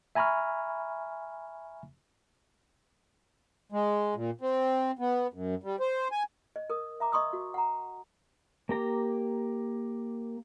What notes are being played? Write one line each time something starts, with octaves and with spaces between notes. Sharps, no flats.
E5 G#5 A#5 B5 C#6 F6
G#3
A#2
C4
B3
F#2
G3
C5
G#5
D#5
A#4 D#6
E5 A#5 D6
D#5 C6 C#6 D#6 E6
F#4
F#5 A#5
A#3 G4 A#5